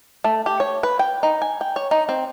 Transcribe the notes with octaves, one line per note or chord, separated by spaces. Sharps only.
A3
G4
C#5
B4
G5
D#4
G#5
G5
C#5
D#4
C4